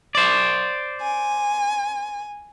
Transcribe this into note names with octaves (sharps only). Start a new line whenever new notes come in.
C5 D5
G#5